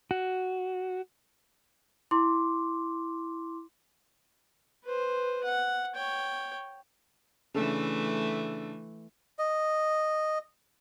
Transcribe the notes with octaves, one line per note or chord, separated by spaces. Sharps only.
F#4
E4 C6 D6
B4 C5
F#5
C#5 G5
C#3 E3 A3 D4 A4
D#5